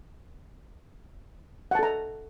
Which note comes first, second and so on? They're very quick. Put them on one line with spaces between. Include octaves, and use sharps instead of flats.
F#5 A5 A4 A#5